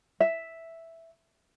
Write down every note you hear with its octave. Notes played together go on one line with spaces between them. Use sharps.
E5